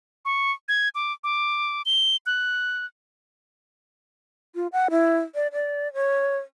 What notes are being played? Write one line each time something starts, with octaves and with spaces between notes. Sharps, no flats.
C#6
G#6
D6
D6
G7
F#6
F4
F#5
E4
D5
D5
C#5